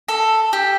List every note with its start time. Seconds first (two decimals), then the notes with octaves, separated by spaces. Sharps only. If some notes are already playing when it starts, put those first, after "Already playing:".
0.08 A4
0.53 G4